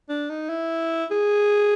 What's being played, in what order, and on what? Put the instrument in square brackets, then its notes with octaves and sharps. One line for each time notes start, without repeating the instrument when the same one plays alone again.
[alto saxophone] D4
D#4
E4
G#4